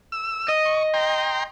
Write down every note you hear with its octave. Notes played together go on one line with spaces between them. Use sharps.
E6
D#5
C#6
G5 A#5 C6